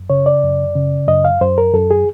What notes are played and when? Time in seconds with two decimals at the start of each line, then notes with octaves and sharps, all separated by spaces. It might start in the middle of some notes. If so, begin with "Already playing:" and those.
Already playing: F#2
0.10 C#3 C#5
0.26 D5
0.43 F#2
0.75 C#3
1.08 F#2 D#5
1.25 F5
1.41 F#2 C5
1.58 A#4
1.74 F#2 A4
1.91 G#4